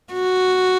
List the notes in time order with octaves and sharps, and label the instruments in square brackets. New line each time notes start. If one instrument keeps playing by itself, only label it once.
[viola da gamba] F#4